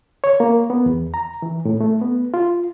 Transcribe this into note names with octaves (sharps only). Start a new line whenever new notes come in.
C#5
A#3
B3
E2
A#5
E3
A2
A3
B3
F4